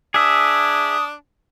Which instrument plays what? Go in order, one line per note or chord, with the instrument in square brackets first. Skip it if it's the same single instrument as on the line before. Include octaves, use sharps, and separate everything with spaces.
[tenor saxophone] D4 [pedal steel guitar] G#4 E5 [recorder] D#6